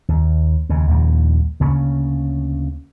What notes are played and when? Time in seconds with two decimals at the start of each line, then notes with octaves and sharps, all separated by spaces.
0.09 D#2
0.69 D#2 C#3
0.87 A#1 D#2 G3 A#3
1.60 D2 C#3 A#3 C#4